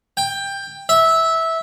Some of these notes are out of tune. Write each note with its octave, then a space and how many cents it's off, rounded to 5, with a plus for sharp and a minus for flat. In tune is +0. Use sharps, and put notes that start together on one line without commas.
G5 +15
E5 -15